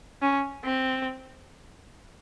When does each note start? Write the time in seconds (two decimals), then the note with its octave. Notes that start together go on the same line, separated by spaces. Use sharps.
0.22 C#4
0.65 C4